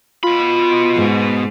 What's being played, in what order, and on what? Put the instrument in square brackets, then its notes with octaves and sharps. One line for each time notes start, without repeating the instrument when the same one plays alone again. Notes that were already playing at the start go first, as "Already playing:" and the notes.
[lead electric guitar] B2 B5 [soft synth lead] F4
[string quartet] G#2